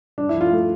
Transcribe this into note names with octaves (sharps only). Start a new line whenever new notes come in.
G2 D4
E4
F3
F4
A3